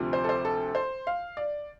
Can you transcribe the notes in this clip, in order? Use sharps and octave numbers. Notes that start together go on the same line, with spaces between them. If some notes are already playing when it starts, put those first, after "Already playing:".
Already playing: D2 C3 F3
C5
A4
C5
A4
C5
F5
D5